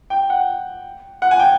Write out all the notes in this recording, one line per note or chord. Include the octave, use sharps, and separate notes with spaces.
G5
F#5
F#5
G#5
G5